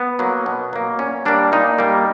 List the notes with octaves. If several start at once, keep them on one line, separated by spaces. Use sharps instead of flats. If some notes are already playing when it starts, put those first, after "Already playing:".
Already playing: B3
F#3 A#3
B2
F#3 A#3
A#2 C#4
G3 A#3 D4
A#2 D#4
G3 A#3